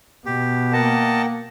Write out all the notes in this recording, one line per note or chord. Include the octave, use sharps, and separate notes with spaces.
B2 G4
A#3 A#4 D#5 F#5 G5 A5